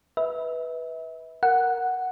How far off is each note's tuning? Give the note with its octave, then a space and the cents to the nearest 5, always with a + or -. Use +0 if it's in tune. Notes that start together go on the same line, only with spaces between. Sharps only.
B4 -5 E5 -35
A#4 +0 F#5 +0